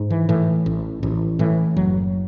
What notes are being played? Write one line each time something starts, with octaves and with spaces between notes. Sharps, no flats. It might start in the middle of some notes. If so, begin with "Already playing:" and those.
Already playing: G#2
E3
A2 E3
A1
A1
A2 E3
F#1 F#3